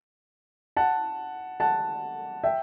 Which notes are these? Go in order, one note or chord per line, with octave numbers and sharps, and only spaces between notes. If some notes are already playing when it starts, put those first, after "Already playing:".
F#5 A5
F#5 A5
E5 G5